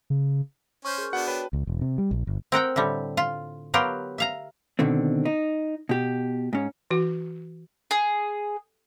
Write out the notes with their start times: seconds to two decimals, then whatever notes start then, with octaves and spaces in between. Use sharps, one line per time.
0.10 C#3
0.85 C#4 C5 C#6 F6 G6
0.98 G#4 A#4
1.13 B3 D4 F#4 F#5
1.28 B4 C#5 G5 A5
1.53 C#2
1.67 E1
1.81 C3
1.98 G3
2.11 A#1
2.27 G1
2.52 C4 A#4 F#5 G5
2.76 A2 D3 G3
3.17 F4
3.74 F#3 B3 F4 G4 A#4
4.18 E5 F5 A#5
4.79 B2 D3 D#3 C4
5.25 D#4
5.89 B2 G4
6.53 G#2 C#4
6.90 E3 F#4
7.91 G#4